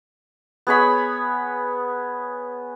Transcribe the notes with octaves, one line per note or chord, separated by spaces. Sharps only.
B3 G#4 C#5 B5